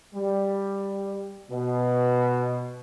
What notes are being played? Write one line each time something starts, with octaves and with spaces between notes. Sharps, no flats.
G3
B2